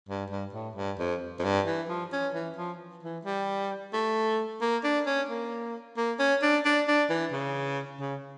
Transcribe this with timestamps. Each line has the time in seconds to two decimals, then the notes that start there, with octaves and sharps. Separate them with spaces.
0.09 G2
0.30 G2
0.53 A2
0.76 G2
0.99 F2
1.39 F2
1.44 G2
1.66 E3
1.89 F3
2.12 C#4
2.34 E3
2.57 F3
3.03 E3
3.25 G3
3.93 A3
4.61 A#3
4.84 D4
5.06 C#4
5.29 A#3
5.97 A#3
6.19 C#4
6.42 D4
6.65 D4
6.88 D4
7.10 E3
7.33 C#3
8.00 C#3